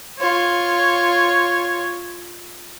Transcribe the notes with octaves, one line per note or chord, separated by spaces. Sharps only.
F4 C#5